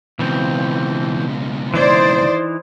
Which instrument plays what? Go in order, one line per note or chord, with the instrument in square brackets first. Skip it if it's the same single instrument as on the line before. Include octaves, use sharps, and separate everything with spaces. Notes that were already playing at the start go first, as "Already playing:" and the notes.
[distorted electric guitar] C#2 B2 [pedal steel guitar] E3 C4
[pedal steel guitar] E3 D#4 E4 [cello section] C5 D5